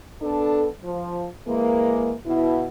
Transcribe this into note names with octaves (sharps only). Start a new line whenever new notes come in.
B3 D4 A4
F3
E3 G#3 A#3
B2 E4